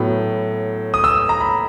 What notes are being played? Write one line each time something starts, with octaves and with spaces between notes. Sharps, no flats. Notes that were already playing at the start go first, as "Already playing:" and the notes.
Already playing: A2 F#3 B3
D#6
E6
A#5
B5